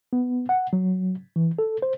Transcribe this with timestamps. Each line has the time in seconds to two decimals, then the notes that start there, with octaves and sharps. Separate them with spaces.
0.13 B3
0.49 F#5
0.73 F#3
1.36 E3
1.59 A4
1.82 C5